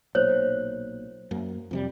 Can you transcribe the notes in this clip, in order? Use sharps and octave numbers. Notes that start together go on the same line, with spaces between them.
B1 A#2 C5 C#5
F#2 A#3
F2 C3 G3